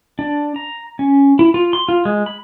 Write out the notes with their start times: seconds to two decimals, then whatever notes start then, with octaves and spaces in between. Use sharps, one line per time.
0.19 D4
0.56 A#5
0.99 C#4
1.39 E4
1.54 F4
1.73 C6
1.89 F4
2.05 G#3
2.26 B5